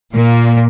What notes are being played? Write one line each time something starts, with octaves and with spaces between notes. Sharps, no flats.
A#2